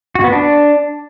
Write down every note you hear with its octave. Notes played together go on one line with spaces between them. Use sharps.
F#4
B3
D4